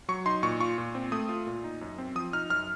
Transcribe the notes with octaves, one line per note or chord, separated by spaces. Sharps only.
F#3 C#6
D#4 C6
A#2 C#6
F4 C#6
A#2
C4
A3 D#6
F4
A#2
D#4
F#2
C4
F3 D#6
D#4 F6
F#2 F6